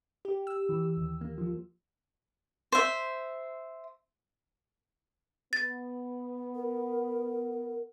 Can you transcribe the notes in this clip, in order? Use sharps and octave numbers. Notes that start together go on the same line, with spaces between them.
G4
E6
E3
D#2
A#3
F3
C5 E5
B3 A6
A#4